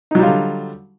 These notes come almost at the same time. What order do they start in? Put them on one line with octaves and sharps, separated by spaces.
D#4 F#3 G3 F4 D3